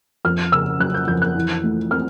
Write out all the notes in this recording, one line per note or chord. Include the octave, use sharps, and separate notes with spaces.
F2 F6
C#3 E6
F#3 F#6
G6
F2 G6
F#6
E3
A3
C4 F6